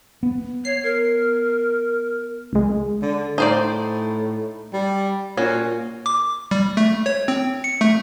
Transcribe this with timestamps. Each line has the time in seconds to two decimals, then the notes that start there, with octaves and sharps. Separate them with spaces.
0.23 B3
0.65 C#5 C7
0.83 A#4
2.53 C#2 G#3
3.02 D3
3.38 A2 D#4 C5 D5
4.73 G3
5.37 A#2 C#4 F#4
6.06 D6
6.51 G3
6.77 A3
7.06 C#5
7.28 C4
7.64 C#7
7.81 A3